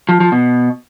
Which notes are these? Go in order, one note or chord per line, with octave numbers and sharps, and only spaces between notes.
F3
F3
B2